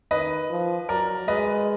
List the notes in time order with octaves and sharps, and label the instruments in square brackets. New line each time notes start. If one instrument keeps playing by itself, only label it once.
[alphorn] D#3 [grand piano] B4 D#5
[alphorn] F3
[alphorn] F#3 [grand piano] A#4 D5
[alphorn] G#3 [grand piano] B4 D#5